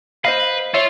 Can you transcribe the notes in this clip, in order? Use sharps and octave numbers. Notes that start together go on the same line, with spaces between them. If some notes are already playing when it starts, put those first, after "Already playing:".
B4 C5 D#5 F5
F4 C#5 E5